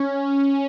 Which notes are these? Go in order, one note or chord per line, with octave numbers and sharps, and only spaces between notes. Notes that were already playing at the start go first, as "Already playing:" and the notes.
Already playing: C#4